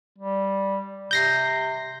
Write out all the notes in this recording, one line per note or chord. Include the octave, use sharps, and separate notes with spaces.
G3
C3 G6 A#6 C7